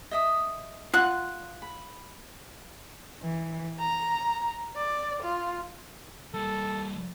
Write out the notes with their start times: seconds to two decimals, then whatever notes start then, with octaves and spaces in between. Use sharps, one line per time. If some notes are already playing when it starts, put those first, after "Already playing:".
0.11 D#5 E5 D#6
0.94 F4 F#5 F#6
1.62 B5
3.22 E3
3.80 A#5
4.78 D5
5.23 F4
6.34 G3 A#3 A4